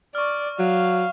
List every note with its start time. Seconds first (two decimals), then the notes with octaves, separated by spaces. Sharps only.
0.15 D5 C#6 F6
0.59 F#3 F5